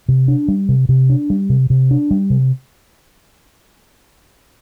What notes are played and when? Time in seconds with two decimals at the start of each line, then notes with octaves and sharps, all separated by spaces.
0.08 C3
0.28 D4
0.48 G3
0.69 C3
0.89 C3
1.10 D4
1.30 G3
1.50 C3
1.70 C3
1.91 D4
2.11 G3
2.30 C3